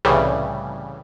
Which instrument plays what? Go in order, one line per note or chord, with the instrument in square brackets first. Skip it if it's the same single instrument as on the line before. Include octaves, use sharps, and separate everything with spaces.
[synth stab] C2 A2 C#3 E3 G3